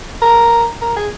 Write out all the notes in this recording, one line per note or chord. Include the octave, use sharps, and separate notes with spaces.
A#4
A#4
G#4